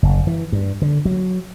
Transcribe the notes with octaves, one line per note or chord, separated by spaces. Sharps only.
F#1
E3
G2
D3
F#3